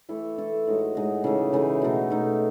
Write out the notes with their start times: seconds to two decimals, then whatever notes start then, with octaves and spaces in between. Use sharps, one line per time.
0.09 E3 A3 E4 A4
0.38 E3 A3 E4 A4
0.67 A2 G#3 D#4 F#4
0.95 A2 G#3 D#4 F#4
1.24 C#3 E3 A3 D#4
1.53 C#3 E3 A3 D#4
1.82 B2 A3 D#4
2.10 B2 A3 D#4